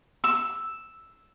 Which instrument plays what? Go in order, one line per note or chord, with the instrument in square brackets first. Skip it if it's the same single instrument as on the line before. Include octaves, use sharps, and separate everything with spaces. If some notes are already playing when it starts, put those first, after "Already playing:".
[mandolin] E6